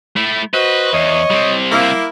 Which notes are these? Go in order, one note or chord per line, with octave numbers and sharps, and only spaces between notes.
A3 E4
F#4 B4 C5 D#5
E2 C#5 D#5
G3 C4
A#3 E4